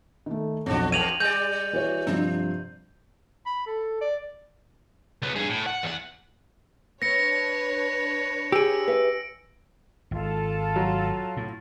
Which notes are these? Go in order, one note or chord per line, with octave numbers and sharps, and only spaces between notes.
D#3 A3
B1 F2 F3 D4 F#4
E2 G5 G#6 D#7 F7 F#7
G3 D5 G6
E3 F#4 C#5
G2 C3 F3 D4
B5
A4
D5
C#2 B3
G2 G#4
A2
F#5
E2 F#5
C4 D4 B4 C#5 A#6 C#7
G4 G#4 E6 D7
B4 E5
G#1 F4 A4
F#3
A2